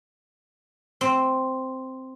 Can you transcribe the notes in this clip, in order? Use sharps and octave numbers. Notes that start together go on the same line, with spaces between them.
C4